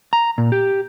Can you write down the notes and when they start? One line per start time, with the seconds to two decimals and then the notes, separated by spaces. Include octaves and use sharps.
0.13 A#5
0.38 A#2
0.52 G4